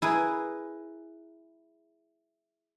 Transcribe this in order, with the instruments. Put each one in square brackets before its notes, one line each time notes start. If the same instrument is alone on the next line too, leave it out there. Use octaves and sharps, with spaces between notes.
[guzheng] E4 G#4 A#4 B4